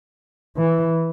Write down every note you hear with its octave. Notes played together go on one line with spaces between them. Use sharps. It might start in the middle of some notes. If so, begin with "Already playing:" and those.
E3